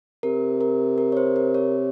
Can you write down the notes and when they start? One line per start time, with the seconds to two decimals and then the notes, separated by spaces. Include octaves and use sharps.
0.23 C3 A#4
0.61 A#4
0.98 A#4
1.12 C#5
1.17 C5
1.36 A#4
1.54 C#5